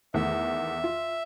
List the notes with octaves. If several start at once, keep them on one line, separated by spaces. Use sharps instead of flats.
E2 D#3 A3 E5
F4